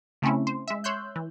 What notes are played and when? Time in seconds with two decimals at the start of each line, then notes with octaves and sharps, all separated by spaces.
0.22 C#3 A3 C4 C#4 E4
0.47 C5
0.68 G#3 E5
0.84 C#5 C6 E6 F#6 G6
1.16 E3